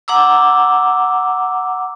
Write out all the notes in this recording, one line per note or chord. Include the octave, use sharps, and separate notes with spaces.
F#5 A#5 D6 E6